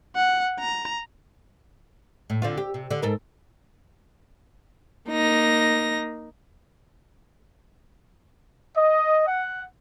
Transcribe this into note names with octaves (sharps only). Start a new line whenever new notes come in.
F#5
A#5
A2
D3 C4 F4
G4
C3
D3
G#2 A4 A#4
A#3 D#4 A#6
D#5
F#5